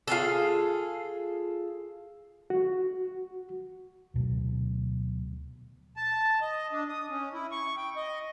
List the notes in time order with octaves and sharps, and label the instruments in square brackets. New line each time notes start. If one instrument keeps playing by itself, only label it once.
[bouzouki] F4 G#4 A4
[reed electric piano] F#4
[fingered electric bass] D2 B2 F#3 A3
[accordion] A5
D#5
D4
D#6
C#4
E4
C#6
G5
D#5